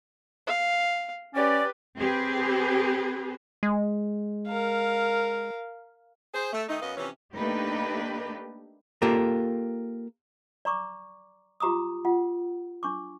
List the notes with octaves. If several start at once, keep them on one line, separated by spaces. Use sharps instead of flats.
F5
C#4 G4 B4 D5
C4 G4 G#4 B4
G#3
A#4 F5
G#4 C5
A3
D#3 A3 D#4
F#2 B3 C#4 D#5 F5
C3 E3 F3 C#4
A3 A#3 D4 D#4 G4 B4
A#3 F4 G4 A4 A#4
D5 A#5 C#6 D6
F4 G4 A#5 D6 D#6
F4 F#5
D4 C#6 D6